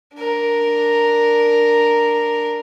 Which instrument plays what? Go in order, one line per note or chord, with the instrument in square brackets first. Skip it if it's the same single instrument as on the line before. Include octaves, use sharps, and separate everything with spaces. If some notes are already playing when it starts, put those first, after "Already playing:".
[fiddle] D4 A#4